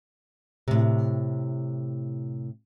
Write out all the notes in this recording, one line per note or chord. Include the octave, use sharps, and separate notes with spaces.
A2 C3